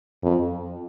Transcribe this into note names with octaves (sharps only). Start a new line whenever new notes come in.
F2